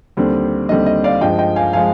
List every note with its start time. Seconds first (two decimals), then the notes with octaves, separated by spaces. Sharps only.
0.17 D#2 D3 G3 C4
0.69 D#2 D3 G3 C4 D#5
0.86 D#5
1.04 D5 F5
1.21 G2 F3 G#3 D#5 G5
1.39 D#5 G5
1.56 F5 G#5
1.73 F3 G#3 F5 G#5